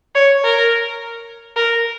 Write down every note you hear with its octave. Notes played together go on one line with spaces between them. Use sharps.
C#5
A#4
A#4